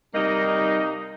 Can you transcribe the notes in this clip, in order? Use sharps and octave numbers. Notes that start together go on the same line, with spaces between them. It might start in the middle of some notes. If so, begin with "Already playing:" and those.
C3 G3 A#3 D#4